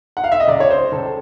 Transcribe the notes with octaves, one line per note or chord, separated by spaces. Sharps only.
F#5
F5
E5
D#5
C#2 D5
C#5
C5
C#2 A4